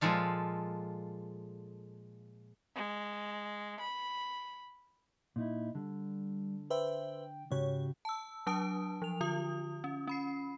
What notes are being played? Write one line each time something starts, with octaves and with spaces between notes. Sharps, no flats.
A#2 F3 G#3 A4 F5
G#3
B5
A#2 D#4 E4
D3 G3
B4 C5 E5 G5
G#2 C#3 F#4 G4 C#5
A5 E6
F#3 D4 A5 D#6 D7
F3 F7
D3 F4 D#6
C#4
C#4 B5 C7